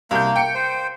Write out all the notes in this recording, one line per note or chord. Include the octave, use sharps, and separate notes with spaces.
C2 A#3 G6
G5 C#7
C5